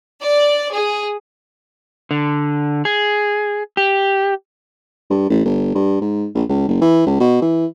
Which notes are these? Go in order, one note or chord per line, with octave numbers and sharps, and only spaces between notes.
D5
G#4
D3
G#4
G4
G2
A1
G1
G2
G#2
A#1
C#2
F#1
E3
C#2
B2
E3